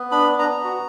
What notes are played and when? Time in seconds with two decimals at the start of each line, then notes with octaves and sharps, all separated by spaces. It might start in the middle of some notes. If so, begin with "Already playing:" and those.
Already playing: B3
0.11 D4 B5
0.29 B3
0.39 A#5
0.47 B3
0.64 F#4